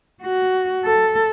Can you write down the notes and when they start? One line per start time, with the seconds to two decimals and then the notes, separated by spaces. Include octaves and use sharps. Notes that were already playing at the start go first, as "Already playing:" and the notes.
0.23 F#4
0.84 A4